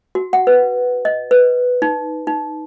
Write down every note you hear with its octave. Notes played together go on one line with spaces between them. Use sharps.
F#4
F#5
B4
D#5
B4
D#4
D#4